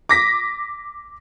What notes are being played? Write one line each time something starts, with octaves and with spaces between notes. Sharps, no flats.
D6 A#6 B6